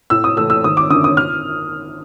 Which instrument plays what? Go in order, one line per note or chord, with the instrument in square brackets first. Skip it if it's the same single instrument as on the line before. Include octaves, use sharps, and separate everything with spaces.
[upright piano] A2 E6
D#6
E3 A3 E6
E6
G#1 D#6
D6
F#2 D3 D#6
D#6
F6